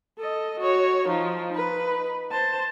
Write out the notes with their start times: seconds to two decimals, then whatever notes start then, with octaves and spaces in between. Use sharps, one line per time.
0.19 A4 D#5
0.60 F#4 C#5
1.08 F3 D#4
1.53 D#4 B4
2.31 C5 A5